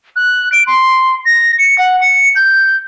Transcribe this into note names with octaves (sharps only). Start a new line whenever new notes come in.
F#6
D7
C6
A#6
C#7
F#5
C#7
G6